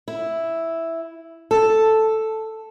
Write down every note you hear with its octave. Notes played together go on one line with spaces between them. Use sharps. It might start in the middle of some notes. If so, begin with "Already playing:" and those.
E4
A4